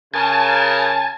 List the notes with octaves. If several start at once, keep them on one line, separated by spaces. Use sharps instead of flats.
C#3 A#4 G#5 A5